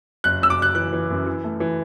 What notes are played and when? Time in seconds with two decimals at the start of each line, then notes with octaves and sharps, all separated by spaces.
0.24 F#1 F#6
0.42 F#1 E6
0.50 D6
0.58 F#1 F#6
0.75 E3 F#6
0.93 E3
1.10 F#2
1.26 E3
1.44 A3
1.60 E3